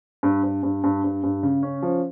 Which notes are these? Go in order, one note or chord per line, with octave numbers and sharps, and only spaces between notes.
G2
G2
G2
G2
G2
G2
C#3
C#4
F3